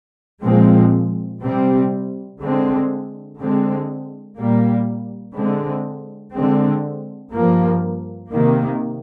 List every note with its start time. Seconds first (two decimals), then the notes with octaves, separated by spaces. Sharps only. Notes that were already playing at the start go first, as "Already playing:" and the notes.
0.43 A#2 F3 G#3 C4
1.42 C3 G3 C4
2.40 D3 G#3 C4
3.39 D3 G#3 C4
4.37 A#2 G3 A#3
5.35 D3 G#3 C4
6.34 D3 G#3 C4
7.32 G2 F3 A#3
8.30 C3 D#3 A#3